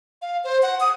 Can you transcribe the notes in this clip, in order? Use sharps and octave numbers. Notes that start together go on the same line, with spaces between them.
F5
C5
F#5
D#6